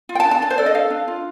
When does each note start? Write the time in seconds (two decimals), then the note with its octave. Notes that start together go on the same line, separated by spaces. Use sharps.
0.09 F4
0.15 G5
0.20 A5
0.25 D4
0.31 A5
0.42 D4 A5
0.50 C5
0.58 A4 D5
0.66 D#5
0.74 A4 F5
0.90 D4
1.08 F4